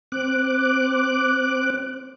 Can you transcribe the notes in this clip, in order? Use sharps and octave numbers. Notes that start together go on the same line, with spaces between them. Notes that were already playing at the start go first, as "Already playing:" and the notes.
C4 D6 F#6